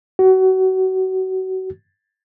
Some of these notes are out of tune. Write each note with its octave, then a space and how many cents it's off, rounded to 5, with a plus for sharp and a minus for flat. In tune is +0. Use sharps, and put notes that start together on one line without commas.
F#4 +30